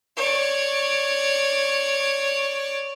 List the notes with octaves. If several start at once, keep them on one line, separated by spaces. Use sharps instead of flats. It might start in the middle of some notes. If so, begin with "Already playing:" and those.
C#5 D5